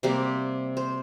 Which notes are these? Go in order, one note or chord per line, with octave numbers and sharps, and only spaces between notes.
C3 G3 A#3 C5
C5